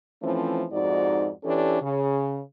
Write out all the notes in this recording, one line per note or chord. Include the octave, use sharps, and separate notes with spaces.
E3 F3 A3 C4 C#4
F2 G#2 D#4 F#4 D5
E3 C#4 D4 G4 A4
C#3